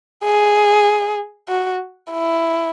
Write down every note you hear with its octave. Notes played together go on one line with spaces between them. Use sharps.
G#4
F#4
E4